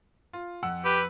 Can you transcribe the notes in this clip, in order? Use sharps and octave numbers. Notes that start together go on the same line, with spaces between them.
F4
F2 F#5 E6
G4 B4